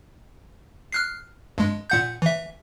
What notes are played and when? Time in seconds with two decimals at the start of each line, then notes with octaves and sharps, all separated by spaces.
0.92 F6 F#6 C7
1.58 G2 G#3
1.90 A#2 F#5 G6
2.22 E3 E5